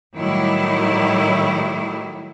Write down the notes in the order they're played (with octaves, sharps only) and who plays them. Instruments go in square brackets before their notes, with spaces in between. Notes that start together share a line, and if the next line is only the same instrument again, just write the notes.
[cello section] A2 D#3 F#3 G3 E4